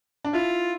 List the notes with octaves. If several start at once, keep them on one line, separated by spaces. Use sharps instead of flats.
D4
E4 F4